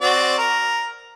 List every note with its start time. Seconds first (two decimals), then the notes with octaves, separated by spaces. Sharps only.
0.01 C4 F#4 D5
0.38 A#4